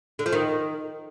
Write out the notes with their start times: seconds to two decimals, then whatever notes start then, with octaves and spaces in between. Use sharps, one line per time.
0.19 D3
0.26 F3
0.33 D#3